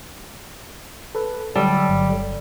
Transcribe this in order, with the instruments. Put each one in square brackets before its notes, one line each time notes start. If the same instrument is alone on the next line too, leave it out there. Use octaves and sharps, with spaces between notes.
[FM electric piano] A4 B4
[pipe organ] D3 F#3 [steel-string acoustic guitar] G3 [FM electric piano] A5 D6 E6
[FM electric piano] G1